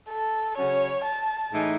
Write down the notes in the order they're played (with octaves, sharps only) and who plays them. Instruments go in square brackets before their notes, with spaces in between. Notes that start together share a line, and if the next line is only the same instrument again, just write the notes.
[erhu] A4
[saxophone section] C#3 F#3 C#4 [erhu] C#5
[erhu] A5
[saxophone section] A2 E3 G#3 D#4